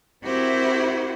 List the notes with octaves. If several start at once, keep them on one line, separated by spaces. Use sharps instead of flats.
C4 E4 F#4 G4 A#4 C5